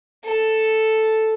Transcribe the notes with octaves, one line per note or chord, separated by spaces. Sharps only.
A4